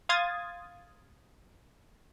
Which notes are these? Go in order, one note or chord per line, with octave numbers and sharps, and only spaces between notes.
F5 C6 D#6 G#6 A6